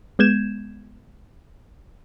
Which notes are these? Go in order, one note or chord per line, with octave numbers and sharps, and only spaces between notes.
G#3 B3 G6 G#6 E7